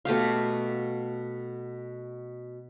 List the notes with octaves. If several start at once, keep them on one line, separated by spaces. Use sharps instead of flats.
B2 A3 G4 F5